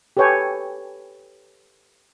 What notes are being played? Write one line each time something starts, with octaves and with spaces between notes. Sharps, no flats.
G4 A4 B4 C#5 G5 G#5